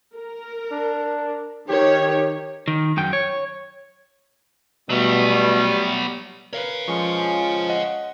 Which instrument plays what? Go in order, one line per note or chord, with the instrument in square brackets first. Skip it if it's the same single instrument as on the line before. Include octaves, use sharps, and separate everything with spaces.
[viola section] A#4
[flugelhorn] D4
[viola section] D#3 C#5 [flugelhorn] G4
[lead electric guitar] D#3
F#2 G5
C#5
[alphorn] B2 [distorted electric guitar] F#3 B3 [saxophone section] G3 [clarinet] A3
[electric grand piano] A#4 B4 [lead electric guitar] C#5 F5
[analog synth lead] F3 [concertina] G#3 C#4 C#6
[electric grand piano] D#5 F#5